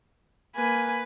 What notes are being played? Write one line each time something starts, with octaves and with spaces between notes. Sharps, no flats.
A#3 B4 G#5